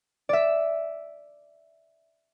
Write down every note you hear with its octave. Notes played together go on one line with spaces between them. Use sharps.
D5 E5